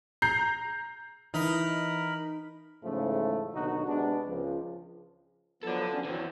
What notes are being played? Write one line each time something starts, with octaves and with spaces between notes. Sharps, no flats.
A#5 G6 C7
E3 D#4 A#4 B5
E2 G#2 C#3 F3 A3
D#2 B2 D3 F#3 D#4 F#4
C3 G#3 B3 D4
C#2 F3
F3 F#3 B3 A4 D5
B3 C#4 D4
F2 E3 F#3 C4